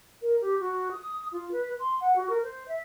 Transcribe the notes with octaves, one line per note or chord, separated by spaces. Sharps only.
A#4
G4
F#4
D#6
F4
B4
C6
F#5
F#4
A#4
C5
E5